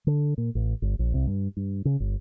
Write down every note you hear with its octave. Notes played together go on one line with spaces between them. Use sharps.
D3
A#2
A1
G1
A#1
C2
G2
G2
C#3
G1